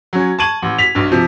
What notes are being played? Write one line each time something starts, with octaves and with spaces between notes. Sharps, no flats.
F#3 C#4
A5 C#6 G#6 D#7 F#7
A1
B6 F7
B1 G2
C3 F3